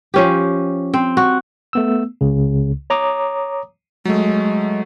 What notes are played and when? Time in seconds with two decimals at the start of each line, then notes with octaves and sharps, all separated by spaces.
0.14 F3 C#4 G4
0.94 C4
1.17 F#4
1.73 A3 B3 E6
2.21 C#2 C#3
2.90 C#5 A#5 D6 D#6
4.05 F#3 G#3 A3